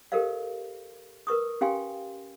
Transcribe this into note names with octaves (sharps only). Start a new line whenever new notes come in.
G4 A4 A#4 C5 D#5 F5
A#4 B4 C#6 D#6
C#4 G4 F5 G5 G#5 C6